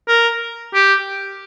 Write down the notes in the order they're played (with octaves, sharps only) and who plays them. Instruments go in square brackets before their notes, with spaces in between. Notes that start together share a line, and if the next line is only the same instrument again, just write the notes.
[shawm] A#4
G4